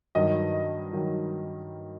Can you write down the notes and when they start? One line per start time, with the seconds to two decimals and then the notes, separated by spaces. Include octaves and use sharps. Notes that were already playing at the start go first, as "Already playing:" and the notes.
0.15 G2 D#3 F#3 D#5
0.93 D#3 F#3